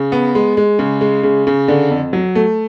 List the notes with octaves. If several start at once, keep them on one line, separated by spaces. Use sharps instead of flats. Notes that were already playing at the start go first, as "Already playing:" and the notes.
Already playing: C#3
B3
G#3
G#3
C#3
G#3
C#3
C#3
D3
F2
F#3
A3